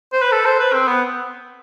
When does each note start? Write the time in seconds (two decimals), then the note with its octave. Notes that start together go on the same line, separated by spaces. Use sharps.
0.13 C5
0.22 B4
0.32 A4
0.45 C5
0.59 B4
0.73 C4
0.88 B3